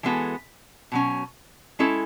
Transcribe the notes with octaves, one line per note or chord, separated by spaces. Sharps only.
E3 G#3 B3 F#4 A4
B2 F#3 C#4
G#3 C#4 E4 A4